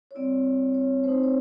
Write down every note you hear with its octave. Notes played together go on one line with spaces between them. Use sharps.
C#5
G3 C4 E4 D5
D5
C#5
A3 C4 D#4 C5
C#5